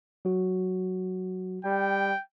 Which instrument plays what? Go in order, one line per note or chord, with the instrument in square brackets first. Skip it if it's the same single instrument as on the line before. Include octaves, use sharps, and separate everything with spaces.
[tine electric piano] F#3 F#4
[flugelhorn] G3 [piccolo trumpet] G5